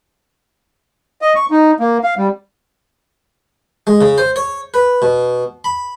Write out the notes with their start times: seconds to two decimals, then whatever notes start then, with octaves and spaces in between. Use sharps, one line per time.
1.22 D#5
1.35 C#6
1.51 D#4
1.80 A#3
2.03 F5
2.18 G3
3.87 G#3
4.01 C#3
4.18 C5
4.36 C#5
4.74 B4
5.02 B2
5.64 B5